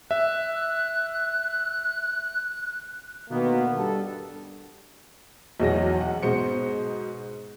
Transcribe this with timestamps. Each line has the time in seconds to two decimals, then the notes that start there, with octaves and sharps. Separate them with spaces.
0.11 E5 F#6
3.30 B2 D3 D#3 A#3 B3
3.76 G2 A4
5.60 B1 E2 F#3 A#6
6.01 F#5
6.23 G#2 B2 C5 C#7